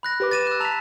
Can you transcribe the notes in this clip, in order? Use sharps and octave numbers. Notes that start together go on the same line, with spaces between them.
B5 F#6 A#6
G4 B4 D6
A6 D#7 E7
E6 F#6
A5 A#5 E6 B6 F7